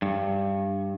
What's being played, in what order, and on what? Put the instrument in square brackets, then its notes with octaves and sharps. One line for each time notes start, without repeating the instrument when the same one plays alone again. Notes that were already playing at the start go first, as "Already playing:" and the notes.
[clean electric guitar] G2